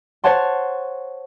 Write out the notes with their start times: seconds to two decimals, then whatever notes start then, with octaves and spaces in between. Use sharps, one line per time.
0.24 C5 C#5 F#5 A5 C6